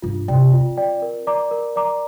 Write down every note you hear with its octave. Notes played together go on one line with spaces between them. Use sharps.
G2 F4
C3 D5 G5
C4 F4
D5 G5
A#4
D5 A#5 D6
A#4
D5 A#5 D6